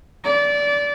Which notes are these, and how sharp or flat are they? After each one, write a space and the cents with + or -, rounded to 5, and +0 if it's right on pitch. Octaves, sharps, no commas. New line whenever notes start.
D5 -20